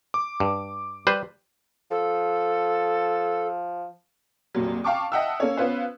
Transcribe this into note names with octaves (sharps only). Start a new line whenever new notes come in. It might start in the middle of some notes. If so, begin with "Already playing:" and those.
D6
G2
G3 B4 C5
F3 A4
F1 A#2 F#3
F5 G5 A5 C#6 D6
D#5 E5 F#5 G5 A5 E6
A#3 C#4 A4 C#5
B3 C#4 F4 B4 C5